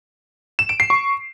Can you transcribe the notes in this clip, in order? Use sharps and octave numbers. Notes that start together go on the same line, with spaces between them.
E7
D7
C7
C#6